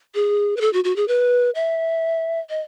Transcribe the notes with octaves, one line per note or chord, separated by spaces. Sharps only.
G#4
B4
A4
F#4
F#4
G#4
B4
E5
D#5